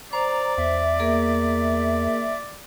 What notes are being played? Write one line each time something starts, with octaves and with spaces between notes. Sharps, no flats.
C5 D5 A#5
E2 E5
A#3 G#4 A#4